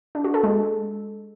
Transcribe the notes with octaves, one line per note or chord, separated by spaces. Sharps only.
D4
F#4
A4
G#3